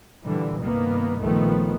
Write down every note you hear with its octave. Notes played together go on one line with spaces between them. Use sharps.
A#2 D3 E3 G3
C2 G2 D#3 A#3 B3
A#1 D#3 F3 A3 B3